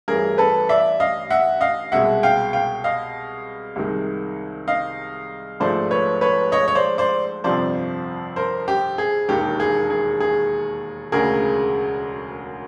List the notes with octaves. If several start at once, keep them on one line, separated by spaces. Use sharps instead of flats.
A1 G2 E3 G#4 A#4
A4 B4
D5 E5
D#5 F5
E5 F#5
D#5 F5
C2 B2 G#3 E5 F#5
F5 G5
F5 G5
D#5 F5
C2 C3 D#3 G#3
D#5 F5
A#1 G#2 F3 A3 C5 D5
B4 C#5
B4 C#5
C#5 D#5
C#5
C5 D5
C5 D5
G1 F2 C3 F3 C5 D5
A#4 C5
G4
G#4
E1 D#2 D#3 G4
G#4
G#4
G#4
E1 D2 C#3 G#4 A#4